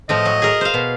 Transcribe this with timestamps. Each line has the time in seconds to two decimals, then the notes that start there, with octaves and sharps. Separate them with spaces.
0.09 A2 F3 D#5
0.25 F#3
0.42 G#4 A#4
0.61 C5 F5
0.74 B2